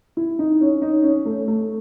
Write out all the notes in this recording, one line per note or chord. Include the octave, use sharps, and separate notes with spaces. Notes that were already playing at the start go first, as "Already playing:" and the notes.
E4
D#4
C#4
D#4
C#4
A3
A3